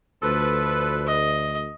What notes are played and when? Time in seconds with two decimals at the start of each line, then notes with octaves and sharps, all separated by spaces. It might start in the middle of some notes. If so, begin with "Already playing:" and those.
0.23 D2 F3 A4 B4
1.07 D#5